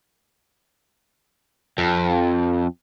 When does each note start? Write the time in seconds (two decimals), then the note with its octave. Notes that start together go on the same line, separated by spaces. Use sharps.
1.78 F2